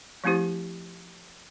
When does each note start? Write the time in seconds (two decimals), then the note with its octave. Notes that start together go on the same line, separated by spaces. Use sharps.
0.24 F3 A3 C4 E4 G4 C5